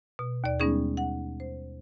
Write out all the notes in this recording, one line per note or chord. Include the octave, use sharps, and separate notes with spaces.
B2
D#2 D5
G3 G#3 B3 C#4 D#4 G#4
F#5
C5